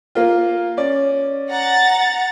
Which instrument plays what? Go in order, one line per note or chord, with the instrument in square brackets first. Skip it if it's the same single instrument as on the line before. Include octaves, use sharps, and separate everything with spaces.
[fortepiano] A#3 F4
C#4 D5
[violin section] F#5 A#5 A6